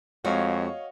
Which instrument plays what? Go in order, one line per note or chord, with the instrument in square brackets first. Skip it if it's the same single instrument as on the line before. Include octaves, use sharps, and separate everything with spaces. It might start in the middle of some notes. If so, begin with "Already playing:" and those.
[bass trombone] F2 [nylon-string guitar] G#3 C4 [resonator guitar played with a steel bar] F#4 [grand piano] C#5 D#5 F5